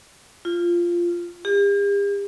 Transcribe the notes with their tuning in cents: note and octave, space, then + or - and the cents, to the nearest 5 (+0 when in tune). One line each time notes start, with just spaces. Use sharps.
F4 -10
G4 +45